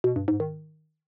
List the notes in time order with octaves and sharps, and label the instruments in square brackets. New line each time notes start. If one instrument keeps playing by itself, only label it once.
[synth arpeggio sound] B2
G2
G#2
D#3